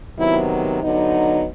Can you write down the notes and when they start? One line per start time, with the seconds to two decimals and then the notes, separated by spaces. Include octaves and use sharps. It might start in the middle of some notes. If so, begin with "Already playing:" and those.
0.18 C3 D#3 F#3 B3 E4
0.82 D3 F#3 B3 D#4